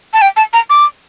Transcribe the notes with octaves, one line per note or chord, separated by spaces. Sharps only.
A5
G5
A5
A#5
D6